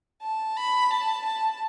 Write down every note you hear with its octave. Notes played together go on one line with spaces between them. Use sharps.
A5
B5
A5
A5